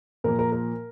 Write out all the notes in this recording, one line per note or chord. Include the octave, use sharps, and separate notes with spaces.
A#2 F3 A#3 A#4
A#4
A#4